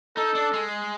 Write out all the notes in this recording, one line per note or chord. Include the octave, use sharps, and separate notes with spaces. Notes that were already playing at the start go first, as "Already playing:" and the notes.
D#4 A4
D4
G#3